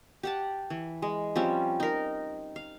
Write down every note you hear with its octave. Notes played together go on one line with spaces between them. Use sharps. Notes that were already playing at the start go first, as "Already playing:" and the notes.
G4 F#5 A5
E3
G#3
F3 G3 C4 C#4
D#4 A#4
F5